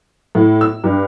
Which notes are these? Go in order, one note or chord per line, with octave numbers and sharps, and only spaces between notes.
A2
E6
G2